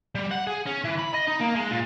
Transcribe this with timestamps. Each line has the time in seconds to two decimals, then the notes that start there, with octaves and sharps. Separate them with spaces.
0.15 G3
0.31 F#5
0.47 G#4
0.66 C#4
0.84 E3
0.98 B5
1.13 D#5
1.28 D#4
1.41 A#3
1.56 G#3
1.71 A#2